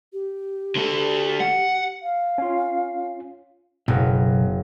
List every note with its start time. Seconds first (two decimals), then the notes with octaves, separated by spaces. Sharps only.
0.13 G4
0.76 D3 A3
1.40 F#5
2.02 F5
2.38 C#4 F4
3.88 F#1 B1